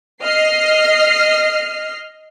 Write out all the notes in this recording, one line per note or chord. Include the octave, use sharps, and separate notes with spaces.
D#5 F6 C7